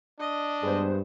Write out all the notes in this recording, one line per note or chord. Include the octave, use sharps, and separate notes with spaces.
D4 D#5
G2 G#3 B3 C5